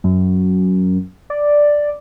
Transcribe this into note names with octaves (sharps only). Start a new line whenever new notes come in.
F#2
D5